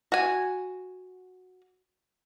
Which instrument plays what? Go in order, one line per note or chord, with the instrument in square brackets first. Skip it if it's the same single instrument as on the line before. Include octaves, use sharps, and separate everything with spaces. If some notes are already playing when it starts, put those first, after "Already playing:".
[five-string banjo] F#4 G#5